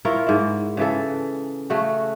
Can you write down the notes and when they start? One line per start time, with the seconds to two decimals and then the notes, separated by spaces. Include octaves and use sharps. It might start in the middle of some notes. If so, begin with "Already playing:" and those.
0.05 E4 F4 A#4 C#5
0.27 G#2 E4
0.77 C#3 E3 A4
1.70 C#3 A3 F#4